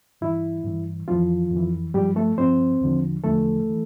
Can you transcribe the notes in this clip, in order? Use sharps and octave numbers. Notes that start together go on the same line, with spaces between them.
G2 E3 E4
G2 E3
F2 E3 F3 F4
F2
E3
G2 F3 G3 G4
A3 A4
G2 F3 C4 C5
E2 D3 F3
E2 D3 F3 A3 A4
E3